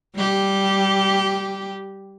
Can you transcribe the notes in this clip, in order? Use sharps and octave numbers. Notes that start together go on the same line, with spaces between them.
G3 G4